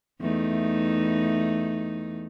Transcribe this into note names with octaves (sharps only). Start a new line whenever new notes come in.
E2 A3 D#4